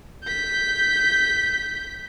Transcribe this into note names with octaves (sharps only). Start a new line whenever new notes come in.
G6 B6